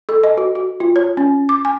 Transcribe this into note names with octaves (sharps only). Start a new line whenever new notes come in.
A4
D#5
F#4
F#4
F4
C#5
C#4
D6
G#5